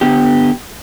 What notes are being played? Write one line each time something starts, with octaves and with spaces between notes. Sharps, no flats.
D3 B3 G4